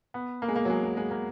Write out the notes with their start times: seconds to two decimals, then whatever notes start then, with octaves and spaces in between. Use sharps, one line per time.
0.14 B3
0.42 A#3
0.48 G#3
0.56 A#3
0.65 F#3
0.69 G#3
0.83 G#3
0.97 G#3
1.11 A#3